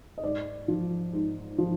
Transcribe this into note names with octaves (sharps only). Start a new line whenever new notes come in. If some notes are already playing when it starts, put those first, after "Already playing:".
D#5
G#2 D5
F3
G#2
F3